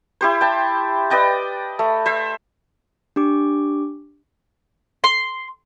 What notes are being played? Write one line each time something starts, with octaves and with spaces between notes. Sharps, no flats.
E4 G4 C5
G5 A5
B4 D5 D#5 G5
A3
C5 E5
D4 G4 D6
C6